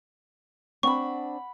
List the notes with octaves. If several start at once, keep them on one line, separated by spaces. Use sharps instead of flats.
C4 D4 F#5 B5 C#6